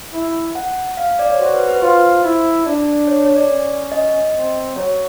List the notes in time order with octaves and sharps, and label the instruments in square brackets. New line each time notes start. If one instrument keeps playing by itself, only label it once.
[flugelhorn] E4
[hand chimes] F#5
F5
D5
C#5
[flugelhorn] F#4 [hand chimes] C5
[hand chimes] B4
B4
[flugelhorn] F4 [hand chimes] C5
[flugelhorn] E4
[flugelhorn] D4 [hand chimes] D5
[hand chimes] C#5
C#5
D5
[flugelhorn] C#4
[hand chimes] D#5
[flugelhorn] C4
[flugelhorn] F#3 [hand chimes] C#5